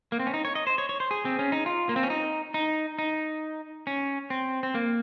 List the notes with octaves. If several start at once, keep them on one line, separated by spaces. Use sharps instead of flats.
A#3
C4
C#4
D#4
C#5
D#5
C5
C#5
C#5
C5
G#4
C4
C#4
D#4
F4
A#3
C4
C#4
D#4
D#4
D#4
C#4
C4
C4
A#3